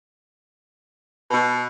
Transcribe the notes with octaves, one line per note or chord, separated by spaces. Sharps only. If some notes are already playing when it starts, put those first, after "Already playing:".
B2